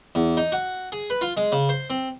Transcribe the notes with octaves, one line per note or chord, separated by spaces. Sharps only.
E2
D#4
F#4
G#4
B4
F4
G#3
C#3
C5
C4